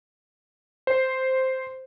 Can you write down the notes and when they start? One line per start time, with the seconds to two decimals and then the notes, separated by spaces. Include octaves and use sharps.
0.87 C5